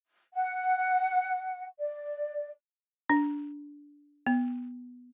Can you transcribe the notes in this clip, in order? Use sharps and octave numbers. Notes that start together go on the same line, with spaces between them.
F#5
D5
D4
B3